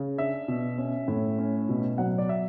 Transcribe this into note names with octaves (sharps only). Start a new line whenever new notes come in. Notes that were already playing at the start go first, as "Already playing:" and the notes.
Already playing: C#3
D4 E5
B2
C#4
A2
C#4
B2
F#3 F#5
D5
E5